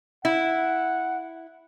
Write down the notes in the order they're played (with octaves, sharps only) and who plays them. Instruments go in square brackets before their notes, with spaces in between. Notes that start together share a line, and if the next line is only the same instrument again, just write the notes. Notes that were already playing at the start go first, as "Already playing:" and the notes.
[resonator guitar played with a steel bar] E4 [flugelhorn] F#5